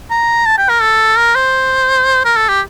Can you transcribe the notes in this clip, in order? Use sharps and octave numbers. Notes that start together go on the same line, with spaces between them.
A#5
A5
G5
A#4
A4
A#4
C5
A#4
A4
G4